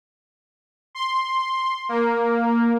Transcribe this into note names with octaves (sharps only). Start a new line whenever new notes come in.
C6
A#3